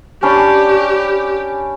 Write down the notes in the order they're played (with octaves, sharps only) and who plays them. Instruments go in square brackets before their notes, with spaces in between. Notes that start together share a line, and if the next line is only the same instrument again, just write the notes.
[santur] C#4 D4 B5 [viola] G4